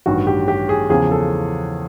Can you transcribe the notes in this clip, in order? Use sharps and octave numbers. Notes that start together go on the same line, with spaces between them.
A1 G2 D#3 F#4
G4
G4
G#4
E2 C#3 F3 G#4
A4